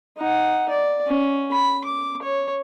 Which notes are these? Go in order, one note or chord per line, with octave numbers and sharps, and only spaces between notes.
D#4 F#5
D5
C#4
B5
D6
C#5